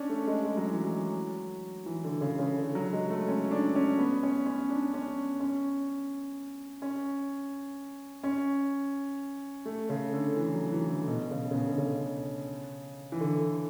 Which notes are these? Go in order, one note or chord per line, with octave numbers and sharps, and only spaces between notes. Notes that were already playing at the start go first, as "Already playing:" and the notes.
Already playing: C#4 D4
A3
G#3
G#3
F#3
E3
F#3
E3
D3
C#3
C#3
D3
F#3
G#3
A3
C#4
D4
C#4
B3
C#4
C#4
D4
C#4
C#4
C#4
C#4
A3
C#3
D3
E3
F#3
E3
D3
B2
C#3
C#3
B2
D3
C#3
E3
D3